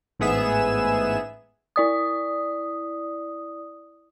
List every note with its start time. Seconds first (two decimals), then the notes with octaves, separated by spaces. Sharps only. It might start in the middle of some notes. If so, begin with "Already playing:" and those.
0.19 A1 G#2 B3 G#4 E5 E7
1.76 E4 D5 D#6